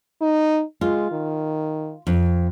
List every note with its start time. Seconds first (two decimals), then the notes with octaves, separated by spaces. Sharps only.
0.22 D#4
0.81 G#3 F4
1.11 D#3
2.07 F2